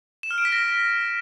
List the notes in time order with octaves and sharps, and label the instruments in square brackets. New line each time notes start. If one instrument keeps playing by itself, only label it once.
[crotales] E7
F6
D7
B6
A#6